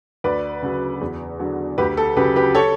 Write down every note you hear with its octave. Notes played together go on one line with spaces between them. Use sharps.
D2 B4 D5
C#3 F#3
E2
D3 F#3
D2 G4 B4
A4
C#3 F#3 G4 B4
G4 B4
A4 C#5